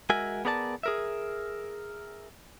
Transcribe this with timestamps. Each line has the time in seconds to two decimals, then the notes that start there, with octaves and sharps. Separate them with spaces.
0.10 G#3 F#4 A#4 E5 G#5
0.45 B3 G#4 A#4 D5 F#5 A5
0.83 G#4 A#4 E5